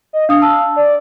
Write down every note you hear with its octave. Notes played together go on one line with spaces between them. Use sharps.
D#5
D4 F5 D#6
A5 E6
D5